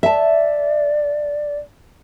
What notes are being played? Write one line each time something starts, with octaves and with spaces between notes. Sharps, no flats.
D5 E5 A5